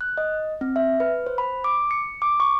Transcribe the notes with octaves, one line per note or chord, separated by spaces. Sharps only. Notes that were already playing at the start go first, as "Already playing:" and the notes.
F#6
D#5
C4
E5
B4
C5
B5
D6
C#7
D6
C#6